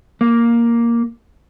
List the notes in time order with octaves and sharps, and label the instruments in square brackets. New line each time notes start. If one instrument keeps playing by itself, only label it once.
[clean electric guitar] A#3